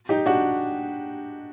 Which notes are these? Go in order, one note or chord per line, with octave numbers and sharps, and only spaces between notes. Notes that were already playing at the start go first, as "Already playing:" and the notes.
D#4 G4
D4 F#4